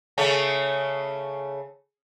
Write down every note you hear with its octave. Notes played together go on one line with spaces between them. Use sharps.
C#3 A3 C#4